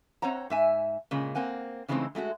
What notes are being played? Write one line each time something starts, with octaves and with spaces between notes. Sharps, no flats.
C4 C5 C#5 F#5 A#5
G#2 E5 G#5
A#2 C#3 G#3
A#3 C4 F#5 G#5
C#3 E3 G#3 A3 C4 D#4
G#3 A3 F4 F#4